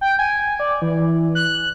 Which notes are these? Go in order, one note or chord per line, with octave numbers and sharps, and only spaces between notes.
G5
G#5
D5
E3
F#6